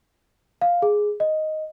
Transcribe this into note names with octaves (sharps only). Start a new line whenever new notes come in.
F5
G#4
D#5